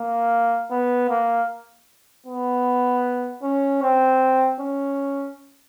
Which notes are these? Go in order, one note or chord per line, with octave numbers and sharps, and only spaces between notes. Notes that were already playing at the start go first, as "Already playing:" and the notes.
Already playing: A#3
B3
A#3
B3
C#4
C4
C#4